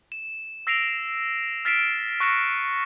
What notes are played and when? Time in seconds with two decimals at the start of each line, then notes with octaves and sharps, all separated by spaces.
0.12 E7
0.67 E6 A#6 C7 D7 E7 F7
1.65 F6 A6 B6 C7 D7 E7
2.20 C#6 F#6 A#6 C#7 E7